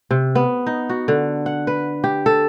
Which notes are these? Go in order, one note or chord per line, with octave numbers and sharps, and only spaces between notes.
C3
B3
D#4
F#4
D3
F#5
B4
G4
A4